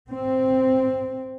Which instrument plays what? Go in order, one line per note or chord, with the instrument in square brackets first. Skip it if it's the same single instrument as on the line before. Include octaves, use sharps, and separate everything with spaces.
[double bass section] C4